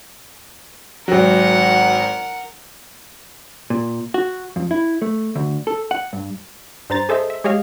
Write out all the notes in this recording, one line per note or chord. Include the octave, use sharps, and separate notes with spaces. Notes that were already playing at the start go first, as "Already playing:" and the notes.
G#1 F#3 A#4 F#5
A#2
F#4
F2
E4
A3
D2
A4
F#5
G2
G2 C5 A#5 A6
G#4 A4 C5 D#5 E5
E5
G#3 G4 C#5 D#5 F5